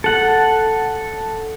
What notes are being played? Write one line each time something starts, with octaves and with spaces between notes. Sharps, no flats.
A4 F#5